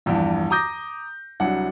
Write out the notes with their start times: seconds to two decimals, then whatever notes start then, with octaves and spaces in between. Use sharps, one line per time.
0.06 A#1 E2 G2
0.50 A#5 D6 D#6 G6 A#6
1.40 C2 F#3 D4 F#5